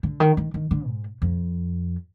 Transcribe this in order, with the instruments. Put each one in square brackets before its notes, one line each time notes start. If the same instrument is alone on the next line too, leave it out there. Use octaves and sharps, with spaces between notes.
[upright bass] D3
D#3
D#3
D#3
D3
G#2
F2